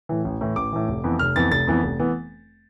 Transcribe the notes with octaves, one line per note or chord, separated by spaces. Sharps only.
A2 E3
A1
A2 E3
A1 D6
A2 E3
F1
F2 E3 B3
F1 F6
F2 E3 B3 A6
F1 A6
F2 E3 B3
F1
E3 B3